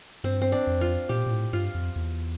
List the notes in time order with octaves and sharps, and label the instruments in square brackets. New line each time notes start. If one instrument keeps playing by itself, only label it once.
[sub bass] G2 [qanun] C4
[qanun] C4
D4
[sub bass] F2
[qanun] F4
[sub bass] A#2 [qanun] G4
[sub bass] A#2
A2
[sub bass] G2 [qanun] F4
[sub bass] F2
E2